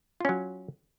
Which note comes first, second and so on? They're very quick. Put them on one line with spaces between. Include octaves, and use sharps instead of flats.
F4 C#4 F#3